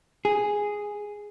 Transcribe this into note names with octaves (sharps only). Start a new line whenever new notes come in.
G#4